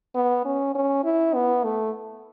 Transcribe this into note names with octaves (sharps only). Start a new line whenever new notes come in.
B3
C#4
C#4
E4
B3
A3